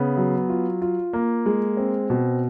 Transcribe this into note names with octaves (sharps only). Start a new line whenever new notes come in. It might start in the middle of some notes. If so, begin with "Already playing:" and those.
Already playing: C#3 B3
F#3
F4
F4
A#3
G#3
C4
B2